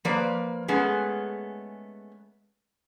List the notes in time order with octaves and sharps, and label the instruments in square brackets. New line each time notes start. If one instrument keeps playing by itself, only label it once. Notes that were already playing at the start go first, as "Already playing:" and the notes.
[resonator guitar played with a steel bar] F3 A#3 B4 D5
G#3 A3 B3 C#4 G#4